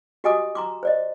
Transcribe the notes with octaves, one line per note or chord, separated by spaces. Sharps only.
F#4 G4 D#5 G#5 D6 D#6
A#5 C6 D6
C5 D5 D#5